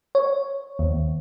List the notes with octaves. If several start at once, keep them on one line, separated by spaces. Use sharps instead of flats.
C#5
D#2